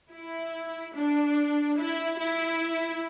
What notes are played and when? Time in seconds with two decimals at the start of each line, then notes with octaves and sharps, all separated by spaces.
0.11 E4
0.95 D4
1.78 E4
2.19 E4